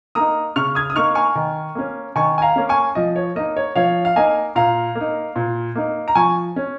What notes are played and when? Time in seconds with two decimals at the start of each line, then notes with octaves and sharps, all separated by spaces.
0.15 A#3 D#4 A#5 D#6
0.56 C#3 C#6 F6
0.75 D#6 G#6
0.90 D#6
0.95 A#3 D#4 C#6 F6
1.15 G#5 C#6
1.35 D#3
1.75 A#3 C#4
2.16 D#3 G#5 C#6
2.38 G#5
2.42 F5 A#5
2.56 A#3 C#4
2.69 G#5 C#6
2.95 F3 D#5
3.16 C#5
3.35 A#3 D#4 D#5
3.57 C#5
3.76 F3 C#5 F5
4.05 F5
4.16 A#3 D#4 D#5 G#5
4.55 A#2 F5 A#5
4.95 A#3
5.01 D#4
5.36 A#2
5.75 A#3 D#4
6.08 A#5
6.15 F3 G#5 C#6
6.56 C#4